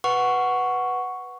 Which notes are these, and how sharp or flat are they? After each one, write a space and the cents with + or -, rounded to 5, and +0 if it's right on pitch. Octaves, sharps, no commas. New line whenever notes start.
B4 +0 F#5 +0 C#6 +0